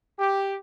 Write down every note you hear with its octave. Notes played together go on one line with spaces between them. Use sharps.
G4